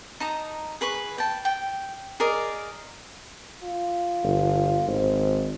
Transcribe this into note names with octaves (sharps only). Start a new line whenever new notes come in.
D#4 A5 A#5 D#6
G#4 B4 B5 C#6
G5 A5
G5
G#4 A#4 D5 D#5
F4
G1
G#1 C5